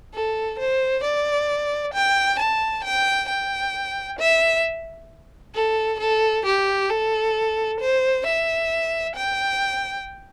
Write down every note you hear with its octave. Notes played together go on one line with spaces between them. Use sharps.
A4
C5
D5
G5
A5
G5
G5
E5
A4
A4
G4
A4
C5
E5
G5